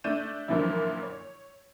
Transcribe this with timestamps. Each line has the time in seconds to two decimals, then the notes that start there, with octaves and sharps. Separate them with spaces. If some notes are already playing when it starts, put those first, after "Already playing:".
0.04 A3 D4 D5 G6 D#7 E7
0.48 F#2 A#2 D3 E3 F3 E4
1.03 C#5